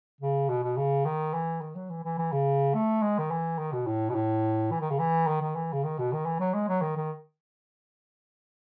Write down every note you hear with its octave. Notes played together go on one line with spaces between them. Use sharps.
C#3
B2
B2
C#3
D#3
E3
D#3
F#3
E3
E3
E3
C#3
A3
G#3
D#3
E3
D#3
B2
A2
B2
A2
E3
D#3
C#3
E3
D#3
D#3
E3
C#3
D#3
B2
D#3
E3
F#3
G#3
F#3
D#3
D#3